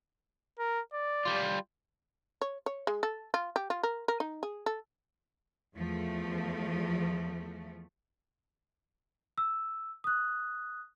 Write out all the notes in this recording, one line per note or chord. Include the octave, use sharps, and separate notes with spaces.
A#4
D5
G3 F4
C#5
C#5
G#3
A4
F4
G4
F4
A#4
A#4
D#4
G#4
A4
E2 F3 A3
E6
D#6 F#6